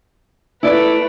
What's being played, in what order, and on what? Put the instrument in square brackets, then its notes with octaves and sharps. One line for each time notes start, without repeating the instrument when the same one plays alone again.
[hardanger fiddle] A3 B4 [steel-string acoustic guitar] E4 D5